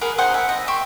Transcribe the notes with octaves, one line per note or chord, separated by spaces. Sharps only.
G#4 A#4 B4 F#5
D#4 G#4 C5 F#5
E5
D#5
E5 G5 C6 C#6